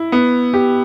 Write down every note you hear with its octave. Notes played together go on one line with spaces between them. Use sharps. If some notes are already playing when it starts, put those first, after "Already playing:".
Already playing: E4
B3
G4